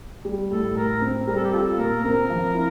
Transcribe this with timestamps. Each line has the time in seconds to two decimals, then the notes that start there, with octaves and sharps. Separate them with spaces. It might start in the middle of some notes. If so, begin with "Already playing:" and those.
0.25 G3
0.51 A2 A4
0.76 A2 A#4
1.02 C4
1.27 G3 A#4
1.36 A4
1.44 G4
1.52 F4 A4
1.78 A#2 A#4
2.04 C4 A#4
2.29 F3
2.55 E4